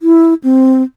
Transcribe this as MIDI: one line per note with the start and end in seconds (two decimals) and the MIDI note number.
0.01 0.34 64
0.44 0.83 60